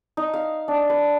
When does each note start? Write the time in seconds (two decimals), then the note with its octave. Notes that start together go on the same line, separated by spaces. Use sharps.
0.17 D#4
0.34 F5
0.68 D4
0.90 B4